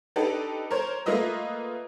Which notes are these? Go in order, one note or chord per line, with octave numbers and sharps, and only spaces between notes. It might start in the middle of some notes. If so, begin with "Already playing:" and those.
D4 D#4 G4 A4 B4
A#4 C5 C#5
A3 A#3 F4 B4 D#5 E5